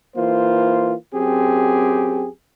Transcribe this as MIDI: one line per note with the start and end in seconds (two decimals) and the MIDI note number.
0.16 0.93 52
0.16 0.93 58
0.16 0.93 65
0.16 0.93 72
1.14 2.28 42
1.14 2.28 60
1.14 2.28 67
1.14 2.28 68